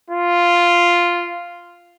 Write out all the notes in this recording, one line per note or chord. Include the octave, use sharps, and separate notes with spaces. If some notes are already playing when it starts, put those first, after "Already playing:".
F4